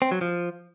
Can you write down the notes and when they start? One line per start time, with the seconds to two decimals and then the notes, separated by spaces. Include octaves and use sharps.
0.02 C4
0.12 F#3
0.21 F3